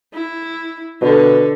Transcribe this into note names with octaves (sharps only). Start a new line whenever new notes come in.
E4
B2 D3